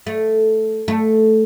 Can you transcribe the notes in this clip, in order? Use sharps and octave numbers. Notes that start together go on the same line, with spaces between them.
A3
A3